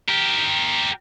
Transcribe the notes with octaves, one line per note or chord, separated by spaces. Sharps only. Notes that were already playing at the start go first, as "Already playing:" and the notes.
G4 A#4